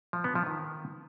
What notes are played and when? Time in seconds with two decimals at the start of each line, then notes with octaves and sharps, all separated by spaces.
0.13 F3
0.24 B3
0.35 F3
0.47 D#3